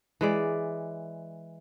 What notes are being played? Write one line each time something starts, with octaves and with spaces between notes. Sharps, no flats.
E3 G#3 D5